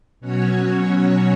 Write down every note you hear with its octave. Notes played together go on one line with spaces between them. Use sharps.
B2 F#3 C#4 F#4 C#5